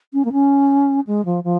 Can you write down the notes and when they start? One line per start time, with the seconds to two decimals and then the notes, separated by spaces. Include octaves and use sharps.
0.13 C#4
0.25 A#3
0.33 C#4
1.07 G#3
1.25 F3
1.44 F3